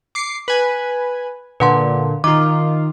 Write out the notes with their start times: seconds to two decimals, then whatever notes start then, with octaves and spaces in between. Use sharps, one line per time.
0.15 D6 C7 C#7
0.48 B4 G#5
1.60 A#2 D3 B4 F#5 C6
2.24 D#3 F4 A#5 D6